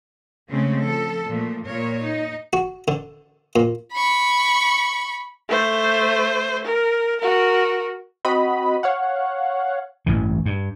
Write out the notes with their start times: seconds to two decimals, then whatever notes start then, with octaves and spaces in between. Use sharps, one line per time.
0.51 C#3 G#3 A3 C4 C#4
0.84 F3 A4
1.27 A#2 F3 A3
1.64 A#2 A#4 C#5
2.01 D#4
2.53 F#4
2.88 D3
3.56 A#2
3.93 B5 C#6
5.49 A3 C5
6.64 A#4
7.20 F#4 A#4
8.25 C4 F#4 D#5 B5
8.83 C#5 F5 F#5
10.06 A1 G2 E3
10.46 G2